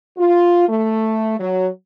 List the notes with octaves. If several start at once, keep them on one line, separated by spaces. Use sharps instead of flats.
F4
A3
F#3